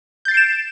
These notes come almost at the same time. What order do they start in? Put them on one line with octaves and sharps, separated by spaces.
G6 A6 C7 D7 E7